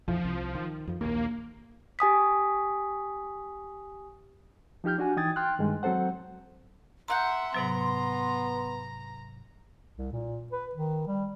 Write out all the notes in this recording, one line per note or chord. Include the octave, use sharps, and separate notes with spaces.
A#1 F2 E3 F3
C2
D#3
F2 F3
A#1 D#2 A#3
G4 G#5 D#6 B6
F3 D#4 G4 F6 G6
D4 F#4 G#5
E3 D#4 G5 D#6 G#6 A6
G5 C6 F6 F#6
G2 D#3 G#3
F#3 C4 A4 C5 F#5
E5 F#5 A#5 C6 F#6 G6
G#2 C3 F#3 B3 A#5
C2
A#2
B4
D#3
G3